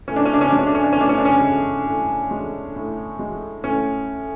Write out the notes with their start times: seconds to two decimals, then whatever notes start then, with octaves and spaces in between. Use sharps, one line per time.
0.08 A2 C#4
0.16 D4
0.25 C#4
0.34 D4
0.41 C#4
0.50 G#3 D4
0.59 C#4
0.67 D4
0.75 C#4
0.84 D4
0.93 C#4
0.97 A2 D4
1.09 C#4
1.18 D4
1.25 C#4
1.41 G#3
1.86 A2
2.31 G#3
2.76 A2
3.19 G#3
3.64 A2 C#4